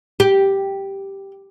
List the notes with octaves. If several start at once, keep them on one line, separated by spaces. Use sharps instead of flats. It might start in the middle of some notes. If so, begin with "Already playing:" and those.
G4